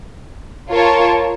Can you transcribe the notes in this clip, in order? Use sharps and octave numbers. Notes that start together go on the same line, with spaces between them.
F4 A#4 C#5 A5